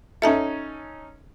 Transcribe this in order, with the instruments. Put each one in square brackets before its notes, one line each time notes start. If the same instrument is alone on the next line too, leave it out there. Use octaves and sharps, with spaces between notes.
[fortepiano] C#4 D#4 A4 [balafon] E5 A5 A#5